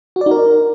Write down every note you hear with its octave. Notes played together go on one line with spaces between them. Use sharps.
F#4
D5
D#4
A#4